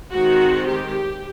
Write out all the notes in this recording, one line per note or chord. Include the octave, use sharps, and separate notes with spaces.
D#3 G#3 C4 F#4
G4